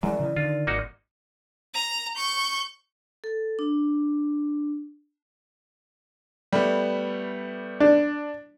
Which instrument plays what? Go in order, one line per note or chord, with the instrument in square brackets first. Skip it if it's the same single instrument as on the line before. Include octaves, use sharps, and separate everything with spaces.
[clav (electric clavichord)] F#2 [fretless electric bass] E3 G#3 [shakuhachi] D5
[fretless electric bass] C#3 E3
[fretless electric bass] D3 D#3 [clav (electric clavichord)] F4
[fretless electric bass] G#1 [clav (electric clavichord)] A#3 D#4 F#4
[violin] A#5
C#6 G6
[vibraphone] A4
D4
[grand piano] G3 A3 B3
[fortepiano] D4